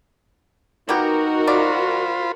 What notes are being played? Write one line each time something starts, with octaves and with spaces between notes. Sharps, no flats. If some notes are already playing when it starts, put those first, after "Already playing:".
A#3 B3 D#4 F#4 G4 A#4
F4 C5 D5 B5